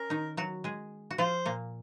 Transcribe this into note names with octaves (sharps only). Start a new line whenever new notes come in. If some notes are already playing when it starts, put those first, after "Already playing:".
Already playing: C#4 A#4
D#3 D#4
F#3 F#4
G#3 G#4
F#4
F3 F4 C5
A#2 A#3